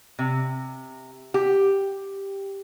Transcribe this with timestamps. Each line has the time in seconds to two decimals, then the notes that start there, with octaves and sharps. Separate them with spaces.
0.19 C3
1.34 G4